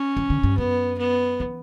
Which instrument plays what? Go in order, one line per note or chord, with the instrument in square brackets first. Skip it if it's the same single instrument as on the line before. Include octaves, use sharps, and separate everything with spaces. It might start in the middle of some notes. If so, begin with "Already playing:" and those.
Already playing: [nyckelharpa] C#4
[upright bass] E3
D3
G2
[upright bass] F#2 [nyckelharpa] B3
[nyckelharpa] B3
[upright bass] E3